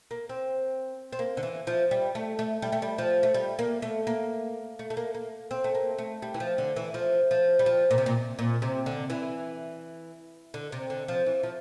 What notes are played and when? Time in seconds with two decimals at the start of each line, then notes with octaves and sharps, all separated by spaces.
0.11 A#3
0.29 C4
1.13 C4
1.19 A#3
1.37 D3
1.43 E3
1.67 F3
1.91 G3
2.15 A3
2.39 A3
2.62 G3
2.72 A3
2.82 G3
2.98 F3
3.23 A3
3.34 G3
3.59 A#3
3.82 A3
4.07 A#3
4.79 A3
4.90 A3
4.97 A#3
5.15 A#3
5.51 C4
5.64 A3
5.75 A#3
5.98 A3
6.22 G3
6.34 E3
6.40 F3
6.58 D3
6.76 E3
6.94 F3
7.31 F3
7.59 G3
7.66 F3
7.91 A#2
7.98 C3
8.06 A#2
8.39 A#2
8.62 C3
8.86 D3
9.10 E3
10.54 D3
10.72 C3
10.90 D3
11.08 F3
11.26 E3
11.43 F3